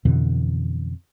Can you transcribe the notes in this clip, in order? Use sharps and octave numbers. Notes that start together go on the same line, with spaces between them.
F2 B2 D3 E3